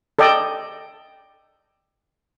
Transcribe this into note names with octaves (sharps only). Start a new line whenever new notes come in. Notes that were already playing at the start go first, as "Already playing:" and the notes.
A4 D5 D#5 G5